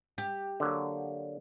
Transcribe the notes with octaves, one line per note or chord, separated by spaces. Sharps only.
G4
D3 F#3 A#3